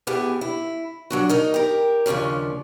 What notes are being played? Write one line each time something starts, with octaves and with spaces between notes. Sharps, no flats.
A2 B3 G4 G#4
E4
F#3 D4 F#4
D#4 A#4 D#5
G4 A#4
D#2 C#3 F3 C#4 D4